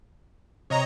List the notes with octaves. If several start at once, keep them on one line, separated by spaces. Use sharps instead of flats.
C3 C#5 D#5 A#5